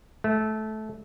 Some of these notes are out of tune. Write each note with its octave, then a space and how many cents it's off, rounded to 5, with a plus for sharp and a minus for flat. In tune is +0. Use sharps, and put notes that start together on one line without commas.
A3 -20